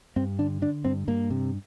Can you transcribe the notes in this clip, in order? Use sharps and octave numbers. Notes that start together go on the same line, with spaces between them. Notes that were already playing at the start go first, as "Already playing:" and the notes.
G2 C4
D3 D4
D3 D4
G2 C4
G2 A#3
C3